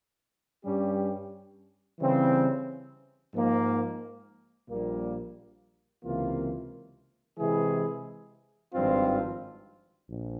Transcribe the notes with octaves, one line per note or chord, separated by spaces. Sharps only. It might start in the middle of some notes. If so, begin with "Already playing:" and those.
G2 G3 C#4 G4
C#3 E3 G3 C4
G#2 F3 A#3
A#1 A#2 G3 A#3
C#2 C3 E3 A#3 F4
C3 E3 G#3 E4 G#4
G#1 G2 F3 C4 F4
A#1